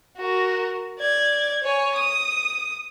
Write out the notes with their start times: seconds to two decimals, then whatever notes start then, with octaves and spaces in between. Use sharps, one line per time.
0.17 F#4 A#4
0.99 D5 G#6
1.64 C#5 G#5
1.95 D#6